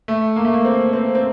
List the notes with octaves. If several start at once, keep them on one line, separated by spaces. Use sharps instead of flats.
A3
A#3
A3
A#3
C4
C4
C4